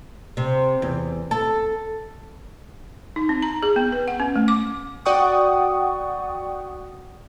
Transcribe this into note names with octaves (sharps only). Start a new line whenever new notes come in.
C3
E2
A4
D#4
C4
A#5
G#4
B3
B4
F#5
C#4
A3
D6
F#4 D5 F#5 G5 C#6 D#6